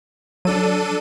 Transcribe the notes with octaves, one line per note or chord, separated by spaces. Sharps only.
F#3 D4 A4 D#7